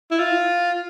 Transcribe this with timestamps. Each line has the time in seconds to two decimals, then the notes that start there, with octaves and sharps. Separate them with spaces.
0.11 E4
0.19 F4